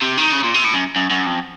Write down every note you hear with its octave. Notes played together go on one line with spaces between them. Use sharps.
C3
D#3
C#3
A#2
C3
A2
F#2
F#2
F#2
F2